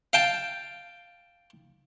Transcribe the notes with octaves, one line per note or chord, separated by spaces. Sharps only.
F5 G5 A5